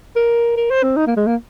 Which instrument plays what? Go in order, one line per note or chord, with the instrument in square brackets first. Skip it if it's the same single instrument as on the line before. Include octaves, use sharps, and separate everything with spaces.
[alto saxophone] A#4
A#4
C5
C4
D#4
A#3
G#3
A#3